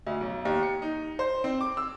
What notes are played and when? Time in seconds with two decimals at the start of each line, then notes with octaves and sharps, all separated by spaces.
0.06 D2
0.21 B1
0.45 D#2
0.63 C#7
0.82 D#4
1.19 C5
1.44 C4
1.61 D6
1.77 E6